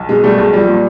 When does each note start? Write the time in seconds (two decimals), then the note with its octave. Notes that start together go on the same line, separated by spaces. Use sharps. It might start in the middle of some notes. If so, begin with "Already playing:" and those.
Already playing: B1
0.09 B2 G#3
0.23 B2 G3 A3
0.38 B1 G#3
0.53 F3 G3
0.68 A#2